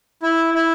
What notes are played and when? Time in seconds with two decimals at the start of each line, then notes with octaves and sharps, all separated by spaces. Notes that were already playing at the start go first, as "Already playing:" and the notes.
0.23 E4
0.54 E4